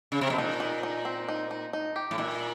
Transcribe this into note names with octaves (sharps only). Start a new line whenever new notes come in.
C#3
C3
B2
A#2 D#4
D#4
D#4
C4
D#4
D#4
D#4
G4
A2
A#2 E4